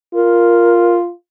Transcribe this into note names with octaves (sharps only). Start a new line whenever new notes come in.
F4 A#4